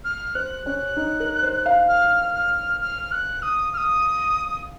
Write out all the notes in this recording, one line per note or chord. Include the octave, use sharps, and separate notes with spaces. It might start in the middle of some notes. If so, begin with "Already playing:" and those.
F6
C5 F#6
C#4 F#6
D#4
A#4
C5
F5
F6
F6
F6
F#6
D#6
F6
D#6